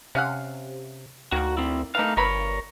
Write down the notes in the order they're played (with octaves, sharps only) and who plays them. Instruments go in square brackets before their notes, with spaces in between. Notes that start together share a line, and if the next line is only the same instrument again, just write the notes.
[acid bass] C3 [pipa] C#4 F5 F#5
[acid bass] D2 [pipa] D#3 A#3 [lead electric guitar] F#4
[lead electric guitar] C4 E4
[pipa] E3 A#3 D#4 [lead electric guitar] A3 F5
[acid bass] G1 [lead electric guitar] A#4 C#5 [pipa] B4 A#5 B5